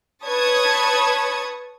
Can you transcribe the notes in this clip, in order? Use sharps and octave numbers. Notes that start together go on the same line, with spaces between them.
B4 C#5 A5 C#6 D#6 G#6